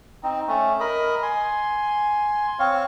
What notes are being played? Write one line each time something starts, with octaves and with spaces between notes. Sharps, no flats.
C4 D#4
A3 C#4
A#4 D#5 B5 D#6
G#5 C6
C4 C#5 F5